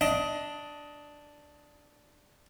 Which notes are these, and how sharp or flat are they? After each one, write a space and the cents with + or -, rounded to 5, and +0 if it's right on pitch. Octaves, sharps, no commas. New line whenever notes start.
D4 +0 D#5 +20